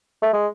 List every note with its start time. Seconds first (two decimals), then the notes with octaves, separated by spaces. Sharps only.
0.23 A3
0.33 G#3